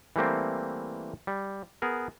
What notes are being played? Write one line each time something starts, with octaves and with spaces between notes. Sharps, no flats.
E3 G3 A3 A#3 C4
G3
B3 G#4 A#4